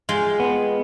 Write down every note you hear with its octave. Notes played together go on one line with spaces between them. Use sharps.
G#3 F4 G5
B3